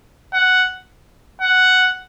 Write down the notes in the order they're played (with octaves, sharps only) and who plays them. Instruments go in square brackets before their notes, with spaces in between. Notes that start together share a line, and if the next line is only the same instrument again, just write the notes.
[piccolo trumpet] F#5
F#5